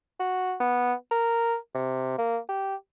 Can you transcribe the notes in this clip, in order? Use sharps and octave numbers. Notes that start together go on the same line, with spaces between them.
F#4
B3
A#4
C3
A#3
G4